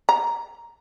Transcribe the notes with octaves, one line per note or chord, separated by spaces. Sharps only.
A#5